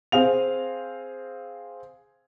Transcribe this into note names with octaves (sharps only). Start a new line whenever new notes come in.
C4 G#4 F5 F7